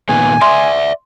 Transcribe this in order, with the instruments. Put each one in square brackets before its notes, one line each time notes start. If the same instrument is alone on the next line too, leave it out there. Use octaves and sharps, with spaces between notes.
[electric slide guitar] A#2 D#3 B3 [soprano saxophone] G#5
[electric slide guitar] D5 E5 [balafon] C6